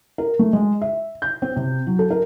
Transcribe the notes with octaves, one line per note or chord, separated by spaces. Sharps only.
A#4
A3
G#3
E5
G6
C4
C3
F#3
A4
A#4